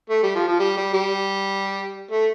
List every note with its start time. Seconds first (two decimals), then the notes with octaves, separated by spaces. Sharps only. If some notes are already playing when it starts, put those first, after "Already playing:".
0.10 A3
0.23 G3
0.35 F3
0.48 F3
0.59 G3
0.77 G3
0.94 G3
2.11 A3